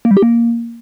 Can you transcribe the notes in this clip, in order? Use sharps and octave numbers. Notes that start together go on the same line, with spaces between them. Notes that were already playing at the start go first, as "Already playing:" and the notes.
A#3
G3
G4
A#3